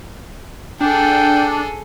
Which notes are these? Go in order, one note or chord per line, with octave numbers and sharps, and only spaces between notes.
D4 G#4 A4 G5